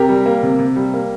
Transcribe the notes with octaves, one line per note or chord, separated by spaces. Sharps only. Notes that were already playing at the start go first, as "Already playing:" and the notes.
Already playing: C3 G4 A#4
G3
A#3
C3
C3
G3
A#3